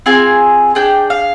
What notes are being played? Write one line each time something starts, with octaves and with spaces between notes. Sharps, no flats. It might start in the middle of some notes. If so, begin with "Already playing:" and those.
C4 F4 G#4 G#5
D4 G#4 G5
F5